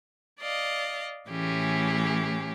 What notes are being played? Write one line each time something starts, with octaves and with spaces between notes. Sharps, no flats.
D5 D#5 F5
A2 E3 A3 C#4 G4 G#4